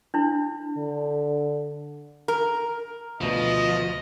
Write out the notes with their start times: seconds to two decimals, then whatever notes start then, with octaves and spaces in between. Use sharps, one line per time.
0.14 D4 E4
0.77 D3
2.28 A#4
3.21 D2 B2 F3 D#5